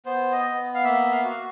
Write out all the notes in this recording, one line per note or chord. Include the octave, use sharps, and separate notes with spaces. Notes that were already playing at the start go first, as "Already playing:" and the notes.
B3 C5
D#5
B3
F5
A#3 E5
F5
F#4